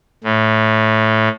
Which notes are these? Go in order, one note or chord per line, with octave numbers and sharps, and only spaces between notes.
A2